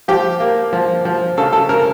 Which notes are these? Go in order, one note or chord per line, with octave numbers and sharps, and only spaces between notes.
F3 G4
A#3
F3
F3
C#3 A4
A4
C#3 A#4